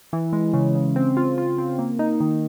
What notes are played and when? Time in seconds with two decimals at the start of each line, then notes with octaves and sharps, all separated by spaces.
0.13 E3
0.33 G#3
0.53 C#3
0.75 C#3
0.96 C4
1.17 F4
1.38 F4
1.58 C4
1.79 A#3
1.99 D#4
2.20 D#3